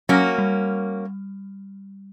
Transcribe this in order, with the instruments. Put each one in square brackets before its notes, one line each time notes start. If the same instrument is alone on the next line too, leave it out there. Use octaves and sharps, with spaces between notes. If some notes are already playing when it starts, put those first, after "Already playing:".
[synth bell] F#3 [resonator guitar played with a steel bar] A#3 C#4 F#4
[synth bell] G3